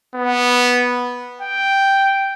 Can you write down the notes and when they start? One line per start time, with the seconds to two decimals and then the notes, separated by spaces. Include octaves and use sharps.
0.15 B3
1.42 G5